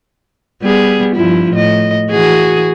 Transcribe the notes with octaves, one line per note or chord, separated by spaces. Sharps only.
G3 B3 G#4
G2 F3 E4
A2 D#5
E3 F#4 G#4